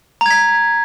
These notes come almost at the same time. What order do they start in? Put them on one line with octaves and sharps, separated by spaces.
A#5 G#6 B6